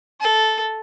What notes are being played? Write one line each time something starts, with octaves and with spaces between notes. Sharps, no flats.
A4